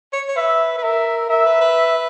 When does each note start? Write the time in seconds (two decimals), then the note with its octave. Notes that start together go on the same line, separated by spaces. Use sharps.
0.13 C#5
0.28 C#5
0.36 B4 E5
0.78 B4
0.83 A#4 E5
1.29 A#4 E5
1.45 B4
1.61 B4